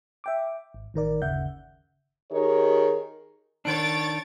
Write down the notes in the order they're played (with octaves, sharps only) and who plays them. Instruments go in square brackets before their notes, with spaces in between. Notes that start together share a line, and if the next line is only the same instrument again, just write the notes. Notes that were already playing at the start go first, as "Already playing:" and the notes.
[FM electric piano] E5 G5 D6
G#1
A1 D#3 A#4 D5
G1 D#2 C#3 E5 F#5 G6
[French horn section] D#3 D#4 G4 G#4 A#4 C#5
[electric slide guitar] D#3 D4 [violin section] C#5 A6 D7